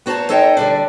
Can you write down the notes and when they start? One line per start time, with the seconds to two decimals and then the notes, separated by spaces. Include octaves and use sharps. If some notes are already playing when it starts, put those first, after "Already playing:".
0.06 B3 F#4 C5 A5 A#5
0.29 D#4 A4 C5 C#5 D#5 G5
0.57 D3 G3 D4